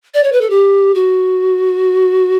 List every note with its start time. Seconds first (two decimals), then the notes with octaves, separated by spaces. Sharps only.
0.14 D5
0.23 C#5
0.32 B4
0.41 A4
0.50 G4
0.95 F#4